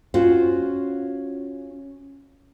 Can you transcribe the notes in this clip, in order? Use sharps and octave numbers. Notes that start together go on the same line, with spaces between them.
C#4 F4 F#4 C5